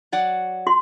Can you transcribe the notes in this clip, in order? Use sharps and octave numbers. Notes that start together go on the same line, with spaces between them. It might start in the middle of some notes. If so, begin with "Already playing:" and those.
F#3 D5 F#5
F#4 C6